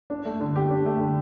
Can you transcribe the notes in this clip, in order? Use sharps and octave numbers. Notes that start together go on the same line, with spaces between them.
D4
A3
D3
G4
D4
A3
D3